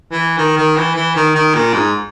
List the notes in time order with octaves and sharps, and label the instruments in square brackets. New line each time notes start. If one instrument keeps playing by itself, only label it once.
[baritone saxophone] E3
D#3
D#3
E3
E3
D#3
D#3
A#2
G#2